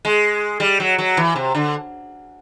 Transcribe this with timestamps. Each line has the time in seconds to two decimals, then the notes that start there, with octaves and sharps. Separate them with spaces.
0.05 G#3
0.60 G3
0.80 F#3
0.98 F#3
1.17 E3
1.36 C3
1.55 D3